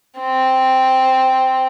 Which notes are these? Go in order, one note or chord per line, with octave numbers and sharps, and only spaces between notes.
C4